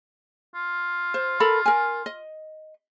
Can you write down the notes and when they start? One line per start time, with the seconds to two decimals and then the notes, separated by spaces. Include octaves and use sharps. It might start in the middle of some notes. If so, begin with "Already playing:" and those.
0.55 F4
1.14 C5
1.40 A4 A#4 B5
1.66 A#4 G#5
2.06 D#5